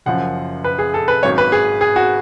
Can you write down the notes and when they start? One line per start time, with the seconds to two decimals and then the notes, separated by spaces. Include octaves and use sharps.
0.06 F#1 F#2 F3 F#5
0.64 B4
0.79 G#4
0.94 A4
1.08 B4
1.23 G#1 G#2 F#3 C#4 C#5
1.38 B4
1.52 G#4
1.81 G#4
1.96 F#4